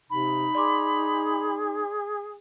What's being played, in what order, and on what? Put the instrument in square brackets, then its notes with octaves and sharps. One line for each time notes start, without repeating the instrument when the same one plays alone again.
[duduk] C3 [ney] D#4 [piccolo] B5
[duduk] G#4 [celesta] D5 C6 D6